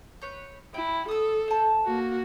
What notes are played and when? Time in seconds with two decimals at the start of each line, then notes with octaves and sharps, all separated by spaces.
0.21 B4 C#5 G6
0.74 E4 G5
1.08 A4 D#6 E6
1.48 C5 A5
1.85 A#3 F#4